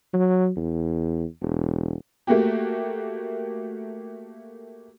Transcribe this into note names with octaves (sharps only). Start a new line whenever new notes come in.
F#3
E2
E1
A3 A#3 F#4 G4